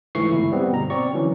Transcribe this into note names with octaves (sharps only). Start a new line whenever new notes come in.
C#2 G#2 E3 A3 C#6 C7
G1 E4
G3 B3 C4
G1 B2 A#5
C4 D5 C#6
D3 E3 F#3 C#4